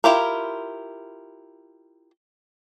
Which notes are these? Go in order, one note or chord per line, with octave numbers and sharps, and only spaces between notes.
E4 F4 G4 A#4